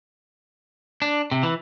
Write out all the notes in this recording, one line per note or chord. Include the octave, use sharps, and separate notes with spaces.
D4
C3
E3